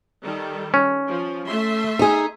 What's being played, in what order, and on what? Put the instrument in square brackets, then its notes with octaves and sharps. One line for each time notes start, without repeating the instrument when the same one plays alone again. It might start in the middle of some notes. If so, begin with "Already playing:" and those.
[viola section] D#3 G3 A4
[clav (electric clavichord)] C#4
[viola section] F3
A3 E5 C6
[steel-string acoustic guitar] D#4 G#4